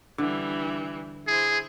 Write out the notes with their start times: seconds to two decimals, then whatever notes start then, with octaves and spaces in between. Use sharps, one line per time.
0.18 D3 E3 G3
1.27 E4 G#4 C5